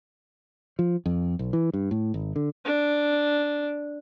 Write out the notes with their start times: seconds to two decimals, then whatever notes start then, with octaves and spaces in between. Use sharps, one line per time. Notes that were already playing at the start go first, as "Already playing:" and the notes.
0.79 F3
1.06 F2
1.39 B1
1.53 E3
1.73 G2
1.91 A2
2.14 G#1
2.36 D3
2.65 D4